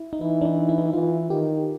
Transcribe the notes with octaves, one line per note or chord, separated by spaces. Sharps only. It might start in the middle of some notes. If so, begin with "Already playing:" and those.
Already playing: E4
D#4
E3 E4
D4
D#4
E4
D#4
E4
E3 F4
D#3 G4